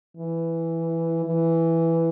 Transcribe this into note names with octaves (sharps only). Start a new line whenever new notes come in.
E3
E3